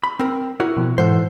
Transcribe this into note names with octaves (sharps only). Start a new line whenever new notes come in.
B5
C4 A#4
E4 F#4 A#4
B2 F3
G#2 E3 A4 C5 F#5